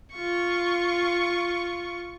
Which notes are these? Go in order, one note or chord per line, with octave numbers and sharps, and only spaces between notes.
F4 C#6